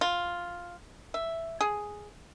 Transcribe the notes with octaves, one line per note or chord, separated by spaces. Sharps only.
F4
E5
G#4